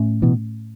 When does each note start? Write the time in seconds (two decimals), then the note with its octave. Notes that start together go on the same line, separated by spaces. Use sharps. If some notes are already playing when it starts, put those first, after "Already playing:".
Already playing: A2 A3 C#4
0.22 B2 E3